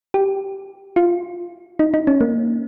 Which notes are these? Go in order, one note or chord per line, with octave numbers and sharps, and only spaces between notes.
G4
F4
D#4
D#4
C#4
A#3